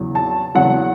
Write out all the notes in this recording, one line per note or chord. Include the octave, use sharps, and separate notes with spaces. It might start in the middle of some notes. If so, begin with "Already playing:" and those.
Already playing: E2 C#3 F#3
A5
E2 C#3 F#3 F#5